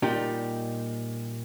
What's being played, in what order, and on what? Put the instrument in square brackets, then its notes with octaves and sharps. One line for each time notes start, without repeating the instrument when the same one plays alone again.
[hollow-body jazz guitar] A#2 G3 D#4 G4